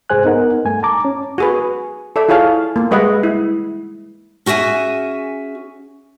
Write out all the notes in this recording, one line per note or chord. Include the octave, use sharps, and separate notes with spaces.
C2 G#2 G#4 C5 G#5 F#6
B3 D#4 A#4 F#5
G2 A3 G#5
A5 A#5 D6
C#4
F#4 G#4 B4
A4 D5 E5
E4 F4 G#4 C#5 F5 A5
A#3
G3 G#3 B4 D#5 E5 F#5
E4
C#4 F#4 G#4 E5 G#5